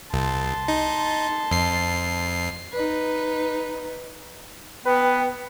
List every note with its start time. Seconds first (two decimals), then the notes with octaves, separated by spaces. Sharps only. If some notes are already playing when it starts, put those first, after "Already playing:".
0.13 C2 A5 C6
0.68 D#4
1.51 F2 C7
2.73 D#4 B4
4.86 B3 B4 G5